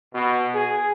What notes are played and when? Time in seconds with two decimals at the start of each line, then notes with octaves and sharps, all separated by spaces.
0.14 B2
0.54 G#4